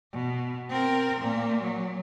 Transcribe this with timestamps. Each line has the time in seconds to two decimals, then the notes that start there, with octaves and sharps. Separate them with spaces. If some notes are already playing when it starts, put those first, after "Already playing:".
0.13 B2
0.69 C4 A#4
1.21 A#2 A#3
1.62 F#3